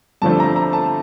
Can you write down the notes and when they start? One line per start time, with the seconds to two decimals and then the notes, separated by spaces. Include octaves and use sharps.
0.22 G2 D3 F3 A3 C4 A5
0.40 A#5
0.56 A#5
0.73 A5